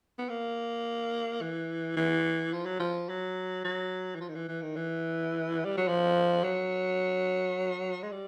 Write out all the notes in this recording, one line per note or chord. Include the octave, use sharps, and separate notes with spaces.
B3
A#3
E3
E3
F3
F#3
F3
F#3
F#3
E3
F3
D#3
E3
E3
D#3
E3
G3
F#3
F3
F#3
G#3
G3